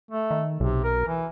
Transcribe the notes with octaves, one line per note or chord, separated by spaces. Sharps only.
A3
D#3
B1 C3
A#4
E3